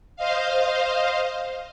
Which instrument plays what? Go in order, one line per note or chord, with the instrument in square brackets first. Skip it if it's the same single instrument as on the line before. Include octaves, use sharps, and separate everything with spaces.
[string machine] C5 D#5 F5